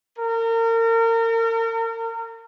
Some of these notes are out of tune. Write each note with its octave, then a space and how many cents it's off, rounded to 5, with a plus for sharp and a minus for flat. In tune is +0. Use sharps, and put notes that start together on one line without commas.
A#4 -35